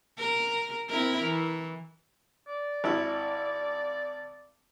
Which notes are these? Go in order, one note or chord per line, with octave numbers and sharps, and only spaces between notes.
A#4
C4 E4 A#4
E3
D5
G#1 E4